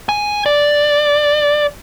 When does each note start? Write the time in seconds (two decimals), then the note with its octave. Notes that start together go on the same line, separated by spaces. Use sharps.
0.09 G#5
0.46 D5